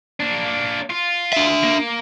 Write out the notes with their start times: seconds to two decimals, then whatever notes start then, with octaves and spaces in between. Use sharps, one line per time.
0.20 A#3 D4
0.90 F4
1.33 D4 E5
1.64 A#3